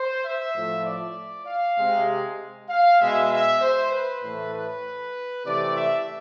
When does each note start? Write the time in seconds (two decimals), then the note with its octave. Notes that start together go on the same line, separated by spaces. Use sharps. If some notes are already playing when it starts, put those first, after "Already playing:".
Already playing: C5
0.25 E5
0.56 A2 F3 A3
0.86 D5
1.47 F5
1.78 C3 G#3
2.70 F5
3.01 B2 G#3 E5
3.31 E5
3.61 C5
3.92 B4
4.23 A2 E3 A3
4.54 B4
5.46 C3 E3 A3 D5
5.77 E5